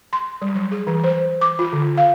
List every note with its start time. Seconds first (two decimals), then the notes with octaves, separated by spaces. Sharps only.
0.13 C6
0.42 G3
0.55 F#3
0.71 G#4
0.87 E3
1.04 C5
1.41 D6
1.59 F4
1.73 D3
1.97 F5